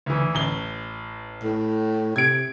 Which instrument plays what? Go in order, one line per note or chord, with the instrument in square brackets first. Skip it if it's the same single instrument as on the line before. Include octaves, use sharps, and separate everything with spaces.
[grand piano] D2 E3
A1 G7
[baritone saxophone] A2
[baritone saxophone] C3 [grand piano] G#6 D7